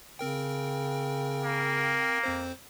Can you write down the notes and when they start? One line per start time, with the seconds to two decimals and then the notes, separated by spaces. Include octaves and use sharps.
0.19 C#3 C4 A#4 G5
1.44 A#3
2.23 F2 C4 C5